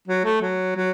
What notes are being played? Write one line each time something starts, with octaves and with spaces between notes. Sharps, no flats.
F#3
A3
F#3
F#3